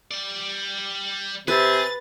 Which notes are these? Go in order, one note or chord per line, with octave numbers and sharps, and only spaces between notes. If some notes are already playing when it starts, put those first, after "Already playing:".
G3 D5
C3 G#4 B4 A6